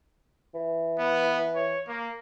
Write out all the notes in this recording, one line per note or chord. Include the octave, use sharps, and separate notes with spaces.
E3
B3
C#5
A#3